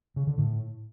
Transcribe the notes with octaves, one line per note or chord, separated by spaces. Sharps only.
C#3
D3
A2